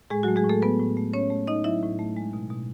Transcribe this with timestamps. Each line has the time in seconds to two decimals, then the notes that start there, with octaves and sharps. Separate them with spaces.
0.10 A2 G#3 G#4
0.23 F#3 F#4
0.28 A3
0.36 G#3 G#4
0.44 A2
0.49 A3 A4
0.62 F#3 B3 B4
0.80 A2
0.97 A3
1.13 A2 C#4 C#5
1.30 A3
1.47 A2 D#4 D#5
1.64 F#3 E4 E5
1.82 A2
1.99 A3
2.17 G#3
2.33 B2
2.50 B2